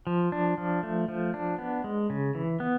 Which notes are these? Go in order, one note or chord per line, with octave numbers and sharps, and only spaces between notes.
F3
D4
F3
A3
F3
D4
B3
G#3
C#3
E3
B3